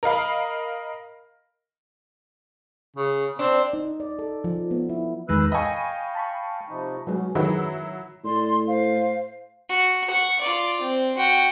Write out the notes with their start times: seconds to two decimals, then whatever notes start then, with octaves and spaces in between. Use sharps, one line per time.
0.03 A#4 D#5 F5 B5
2.96 C#3
3.39 C4 D4
3.73 D#4
4.00 D5
4.19 A4
4.44 F3
4.71 B3
4.89 E4
5.29 E2 D#3 G#3 B4 E6 F#6
5.52 D#5 F5 G5 G#5 B5 C#6
6.15 A5 B5 C#6
6.69 C3 F3 D#4
7.07 F#3 G#3 B3 C#4 F#4
7.35 F#2 D#3 F#3 E4 F#4 G#4 B4
8.25 A2 D5 C6
8.67 C5 F5
9.69 F#4
10.10 F#5 C#6
10.41 F4 D5
10.81 C4
11.18 F#4 G5